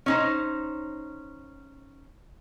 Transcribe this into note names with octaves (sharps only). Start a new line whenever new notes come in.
C#4 D#4 C5